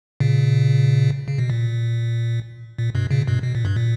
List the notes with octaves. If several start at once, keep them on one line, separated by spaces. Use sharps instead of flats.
A#2 C#3
C#3
B2
A#2
A#2
G2 B2
A#2 C#3
G2 B2
B2
A#2
G2
A#2